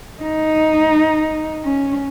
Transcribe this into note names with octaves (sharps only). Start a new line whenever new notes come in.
D#4
C#4